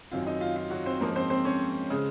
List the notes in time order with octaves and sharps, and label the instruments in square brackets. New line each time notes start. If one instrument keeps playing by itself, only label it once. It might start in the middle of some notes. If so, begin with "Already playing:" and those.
[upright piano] F#2 D#3 F#3 C4 F4
D#4
F4
F4
F#3 F#4
C4 C5
G#2 F3 G#3 A#3 C#4 A#4
C4 C5
C4 C5
C#4 C#5
C#3 G#3